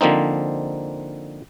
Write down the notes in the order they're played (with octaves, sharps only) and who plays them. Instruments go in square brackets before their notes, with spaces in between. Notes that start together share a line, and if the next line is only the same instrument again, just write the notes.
[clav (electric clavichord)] D3 F3 A#3 C4 D#4